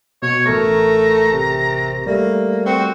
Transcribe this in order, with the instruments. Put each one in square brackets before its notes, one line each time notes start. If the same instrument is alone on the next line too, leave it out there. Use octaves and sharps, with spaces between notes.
[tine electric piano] B2 [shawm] C#5
[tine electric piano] A1 A#4 C#6 [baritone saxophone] A3 [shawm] A#5
[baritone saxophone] C3
[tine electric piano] G3 A3 [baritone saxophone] A#3
[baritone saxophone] C4 [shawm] F#4